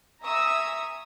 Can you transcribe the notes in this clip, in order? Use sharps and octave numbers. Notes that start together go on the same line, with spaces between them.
E5 G#5 A#5 C#6 D#6 E6